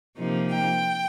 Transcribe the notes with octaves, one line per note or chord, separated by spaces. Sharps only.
C3 F3 A#3 D#4
G5